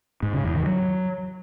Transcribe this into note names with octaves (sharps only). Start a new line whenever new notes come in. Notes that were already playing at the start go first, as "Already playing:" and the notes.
G#2
C#3
E2
D#3
F#3